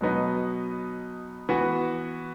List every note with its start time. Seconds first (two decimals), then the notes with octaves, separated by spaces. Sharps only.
0.01 B2 F#3 B3 D#4
1.49 E3 B3 F#4